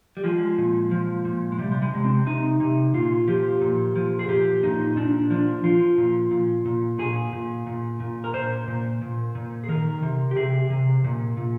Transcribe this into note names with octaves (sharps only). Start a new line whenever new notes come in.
G3
F3 G#3
A#2
F3
A#2
G#3
C3 G3
G3
G#3
C3
C4
C3 D#4
C3
A#2 F4
F3 G4
A#2
F3
G#4
A#2 G4
A#2 D#4
A#2 D4
F3 D4
F3 F4
A#2
A#2
A#2
A#2 G#4
A#2
A#2
A#2
A#4
A#2 C5
A#2
A#2
A#2
G#4
D#3 A#4
C3
G4
C3 G#4
C3
A#2
A#2